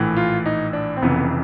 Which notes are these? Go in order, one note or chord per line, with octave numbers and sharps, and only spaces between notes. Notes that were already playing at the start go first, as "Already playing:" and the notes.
Already playing: A#1 A2 E3
F4
D#4
D4
C4
F1 F2 C#3 E3 B3